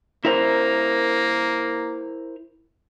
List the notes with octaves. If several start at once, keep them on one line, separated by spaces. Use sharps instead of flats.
A#3 E4 A#4 C5